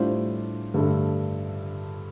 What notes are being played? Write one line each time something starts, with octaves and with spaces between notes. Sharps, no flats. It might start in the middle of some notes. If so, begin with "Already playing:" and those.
Already playing: A2 G3 D4 F4 C5
G2 D3 A3